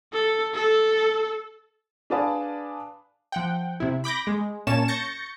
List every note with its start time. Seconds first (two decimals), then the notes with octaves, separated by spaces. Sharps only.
0.13 A4
0.54 A4
2.10 D4 G#4 B4 D5 F5 A5
3.32 F3 F#5 G5
3.80 C3 E4
4.04 B5 D6 G6 A#6
4.27 G#3
4.67 A#2 A#3 C#4 C#5 A5 E7
4.88 C#6 G6 A6 A#6 C#7